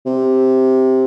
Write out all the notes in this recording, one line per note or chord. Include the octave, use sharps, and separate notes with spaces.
C3